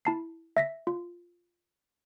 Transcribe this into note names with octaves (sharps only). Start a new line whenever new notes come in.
E4 A5 C7
E5 A#6 B6
F4